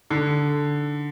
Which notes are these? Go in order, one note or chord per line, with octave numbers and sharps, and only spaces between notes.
D3